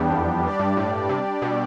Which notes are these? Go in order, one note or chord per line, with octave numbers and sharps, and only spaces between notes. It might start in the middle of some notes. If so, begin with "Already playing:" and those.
Already playing: E2 G3 B3 D4 G4
F2
E2 G3 D4 G4 D5
G2
A2
C3
B2